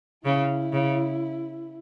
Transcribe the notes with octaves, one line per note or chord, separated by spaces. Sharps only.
C#3 E4
C#3